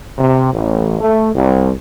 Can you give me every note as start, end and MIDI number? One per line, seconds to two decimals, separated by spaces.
0.18 0.51 48
0.52 0.96 33
1.00 1.29 57
1.33 1.70 36